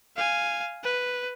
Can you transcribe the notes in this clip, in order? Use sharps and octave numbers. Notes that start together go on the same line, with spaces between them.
F5 G#5
B4